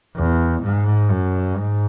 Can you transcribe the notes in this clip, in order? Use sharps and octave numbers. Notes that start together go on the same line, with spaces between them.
E2
G#2
F#2
G#2